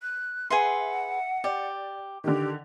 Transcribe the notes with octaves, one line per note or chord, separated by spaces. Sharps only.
F#6
G#4 B4 E5 F#5 C6
G4 D5
D3 D#3 G4